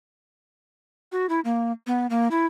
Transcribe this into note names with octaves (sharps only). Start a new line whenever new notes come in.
F#4
E4
A#3
B3
A#3
E4